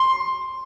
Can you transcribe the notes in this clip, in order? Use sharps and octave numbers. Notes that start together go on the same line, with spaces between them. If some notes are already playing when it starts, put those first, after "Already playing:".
Already playing: C6